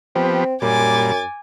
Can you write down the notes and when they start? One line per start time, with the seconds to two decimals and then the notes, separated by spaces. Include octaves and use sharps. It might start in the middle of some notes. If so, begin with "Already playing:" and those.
0.16 F3 B3 C4 G4
0.62 F#2 A#2 G3 G#5 D6 A6